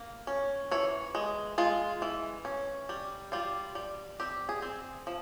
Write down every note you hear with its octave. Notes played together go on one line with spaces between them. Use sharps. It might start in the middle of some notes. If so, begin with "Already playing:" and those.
Already playing: A#3
C#4
E3 C#5
G#3
G#3 F4
E3
C#4
G3
G3 F4
G3
C4 G4
G#4
C4
F3